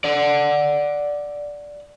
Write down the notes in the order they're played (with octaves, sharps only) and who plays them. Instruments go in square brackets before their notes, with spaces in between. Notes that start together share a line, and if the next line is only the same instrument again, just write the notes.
[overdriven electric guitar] D5 F#5